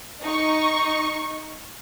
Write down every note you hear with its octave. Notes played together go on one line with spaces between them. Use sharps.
D#4 C#6